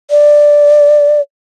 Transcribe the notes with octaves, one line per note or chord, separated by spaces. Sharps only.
D5